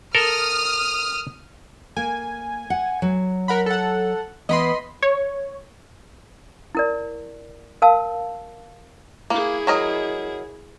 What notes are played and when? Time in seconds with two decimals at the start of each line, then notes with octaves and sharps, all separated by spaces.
0.15 A4 A#4 D#6 F6
1.96 A#3 G#5
2.70 F#5
3.02 F#3
3.48 A#4 F#5 B5
3.66 A4 F#5
4.49 E3 B3 D#5 B5 C6
5.02 C#5
6.75 E4 A#4 D5
7.82 A#4 F5 A5 E6
9.30 A#3 E4 G#4
9.67 F#3 A#4 D#5